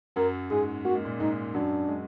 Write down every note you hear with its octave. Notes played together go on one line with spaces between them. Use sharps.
F#2 F#3 A#4
G#2 G#3 G#4
A#3 F#4
G#3
A#2 A#3
G#2 G#3 D#4
F#2 F#3 D4
G#3